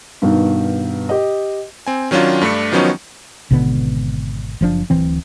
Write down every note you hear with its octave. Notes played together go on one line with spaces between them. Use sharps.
G2 B2 D#3
G4 D#5
C4 G#5
D#3 F#3 C#4 D4 F4
G2 A3 D4 C#7
D#3 F3 F#3 B3 C#4 D#4
G#1 B2 D3 B3
F#1 F3 D4
D1 E3 C4